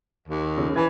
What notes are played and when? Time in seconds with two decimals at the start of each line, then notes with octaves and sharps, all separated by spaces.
0.28 D#2
0.58 C#3
0.76 E3 G#5 B5 G#6